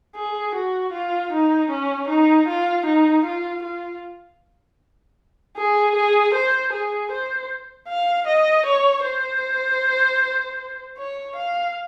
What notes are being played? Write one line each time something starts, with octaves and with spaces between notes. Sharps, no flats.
G#4
F#4
F4
D#4
C#4
D#4
F4
D#4
F4
F4
G#4
G#4
C5
G#4
C5
F5
D#5
C#5
C5
C#5
F5